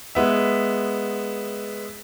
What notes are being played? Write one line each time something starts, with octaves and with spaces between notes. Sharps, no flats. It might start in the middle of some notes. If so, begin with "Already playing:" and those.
G#3 B3 E5